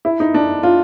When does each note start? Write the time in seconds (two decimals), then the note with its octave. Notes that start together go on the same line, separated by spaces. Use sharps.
0.05 E4
0.20 D#4
0.34 D4
0.63 F4